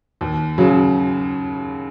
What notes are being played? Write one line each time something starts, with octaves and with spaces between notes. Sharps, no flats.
D#2
C#3 F#3